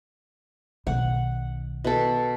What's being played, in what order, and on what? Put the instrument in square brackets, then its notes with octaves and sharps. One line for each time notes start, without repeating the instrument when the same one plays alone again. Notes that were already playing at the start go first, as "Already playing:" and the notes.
[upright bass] B1 D#3 [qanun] F#5
[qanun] B2 A4